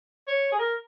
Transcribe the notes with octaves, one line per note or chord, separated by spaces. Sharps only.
C#5
G#4
A#4